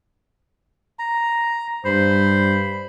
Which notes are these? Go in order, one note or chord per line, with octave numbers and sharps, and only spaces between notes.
A#5
G2 C5 B5